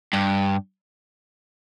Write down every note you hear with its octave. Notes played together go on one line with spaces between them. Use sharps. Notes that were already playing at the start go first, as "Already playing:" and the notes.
G2